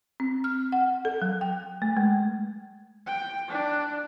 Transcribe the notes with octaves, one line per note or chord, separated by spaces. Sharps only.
C4
F6
F#5
A4
F#3
G5
A3
G#3
G5
D4